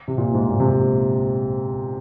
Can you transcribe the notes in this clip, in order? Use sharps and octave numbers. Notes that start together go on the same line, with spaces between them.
C3
A#2
G#2
A#2
C3
A#2